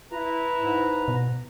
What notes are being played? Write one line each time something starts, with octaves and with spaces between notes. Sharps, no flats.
E4 B4 A#5
G#2
B2